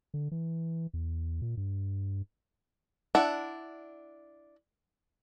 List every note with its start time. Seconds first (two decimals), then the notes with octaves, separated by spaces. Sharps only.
0.14 D3
0.31 E3
0.94 E2
1.42 A#2
1.57 G2
3.15 D4 E4 F#5